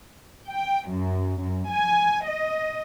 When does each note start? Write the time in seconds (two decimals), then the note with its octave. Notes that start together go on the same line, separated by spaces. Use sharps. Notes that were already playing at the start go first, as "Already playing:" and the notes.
0.47 G5
0.86 F#2
1.39 F#2
1.68 G#5
2.23 D#5